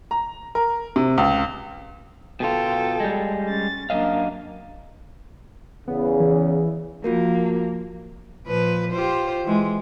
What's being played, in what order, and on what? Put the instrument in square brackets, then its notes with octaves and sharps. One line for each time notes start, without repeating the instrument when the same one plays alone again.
[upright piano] A#5
A#4
C3
C#2
[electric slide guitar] B2 F4 [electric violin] A4 G5
[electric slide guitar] G3 G#3
[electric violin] C#4 A6
[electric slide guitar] F#2 D#5 F5 [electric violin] A#3 D4
[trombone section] E2 C#3 [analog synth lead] B3
[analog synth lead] E3
[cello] F3 A#3 [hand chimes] F4 F#4 A#4
[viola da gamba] A#2 F3 B4
F4 G4 C5
E3 G#3